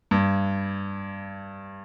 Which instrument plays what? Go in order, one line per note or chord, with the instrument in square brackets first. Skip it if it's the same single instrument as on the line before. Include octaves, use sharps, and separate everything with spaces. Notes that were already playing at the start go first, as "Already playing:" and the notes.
[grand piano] G2